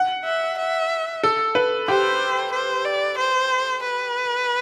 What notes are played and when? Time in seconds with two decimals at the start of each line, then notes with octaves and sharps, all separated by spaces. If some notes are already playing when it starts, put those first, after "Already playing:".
Already playing: F#5
0.25 E5
0.58 E5
1.23 A4
1.55 B4
1.88 G4 C5
2.52 C5
2.85 D5
3.18 C5
3.83 B4